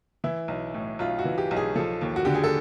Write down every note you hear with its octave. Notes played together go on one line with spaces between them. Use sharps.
E3 E4
B1
A2
B1 F4
F#4
E3
G4
B1
G#4
F3 A4
D#2
F#4
D3 G4
G#4
A4